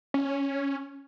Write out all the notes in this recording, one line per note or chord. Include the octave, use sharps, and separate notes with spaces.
C#4